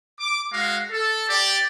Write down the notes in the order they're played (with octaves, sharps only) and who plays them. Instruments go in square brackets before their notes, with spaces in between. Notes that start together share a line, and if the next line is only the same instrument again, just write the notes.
[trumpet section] D6
G#3 F#4 F5
A4
G4 D5